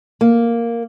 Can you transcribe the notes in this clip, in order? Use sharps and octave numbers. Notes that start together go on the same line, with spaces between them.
A#3